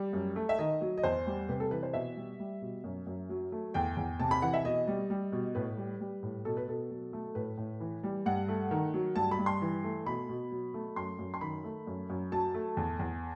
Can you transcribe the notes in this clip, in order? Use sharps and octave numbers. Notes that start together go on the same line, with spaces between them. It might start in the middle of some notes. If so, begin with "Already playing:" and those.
Already playing: G3
F#2
A3
E5
D#3 D#5
F#3
D#5
E2 C5
G3
C3 B4
A4
E3 B4
C5
B2 E5
G3
G3
B2
F#2
F#2
F#3
A3
E2 G5
E2
C3 A5
B5
E3 F#5
E5
B2 D#5
G3
G3
B2
A2 B4
G3
G3
A2
B2 A4
B4
B2 A4
F#3
A3
A2 B4
A2
E3
G3
G2 F#5
A3
D#3
F#3
G2 A5
B5
G2
C6
E3
A3
B2 B5
B2
F#3
A3
F#2 C6
F#2
C6
D#3 B5
A3
F#2
F#2
F#3 A5
A3
E2
E2